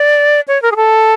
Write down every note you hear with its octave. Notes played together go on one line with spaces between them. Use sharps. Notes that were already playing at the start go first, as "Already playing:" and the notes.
Already playing: D5
C#5
A#4
G#4
A4